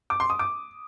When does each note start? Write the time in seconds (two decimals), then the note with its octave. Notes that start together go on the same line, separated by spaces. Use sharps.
0.10 D6
0.20 C6
0.30 D#6
0.39 D6